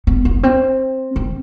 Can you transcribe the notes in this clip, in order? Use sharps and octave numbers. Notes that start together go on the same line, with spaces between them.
B3
B3
C4
C4